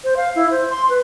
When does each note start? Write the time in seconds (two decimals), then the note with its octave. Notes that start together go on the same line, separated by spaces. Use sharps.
0.04 C5
0.17 F5
0.35 E4
0.51 C5
0.70 C6
0.89 B4